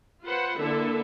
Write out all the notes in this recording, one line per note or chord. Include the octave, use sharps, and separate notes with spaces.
F4 B4 C5 F#5
D3 A#3 E4 A4 E5